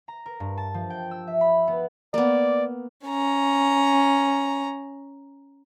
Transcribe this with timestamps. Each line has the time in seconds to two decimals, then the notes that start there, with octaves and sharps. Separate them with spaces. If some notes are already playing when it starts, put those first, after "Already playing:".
0.08 A#5
0.26 A#4
0.40 G2
0.57 A5
0.74 F3
0.90 G5
1.11 E6
1.27 E5
1.41 B5
1.67 B3
2.14 A#3 B3 D5
3.06 C#4 A#5